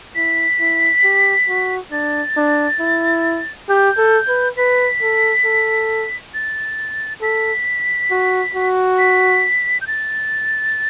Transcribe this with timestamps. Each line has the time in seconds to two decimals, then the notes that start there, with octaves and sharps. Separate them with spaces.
0.15 E4 B6
0.60 E4
1.04 G4
1.48 F#4
1.91 D4 A6
2.37 D4
2.80 E4
3.69 G4 G6
3.98 A4
4.28 B4
4.57 B4 B6
5.02 A4
5.45 A4
6.34 A6
7.21 A4 B6
8.11 F#4
8.55 F#4
8.98 B6
9.81 G6
9.87 A6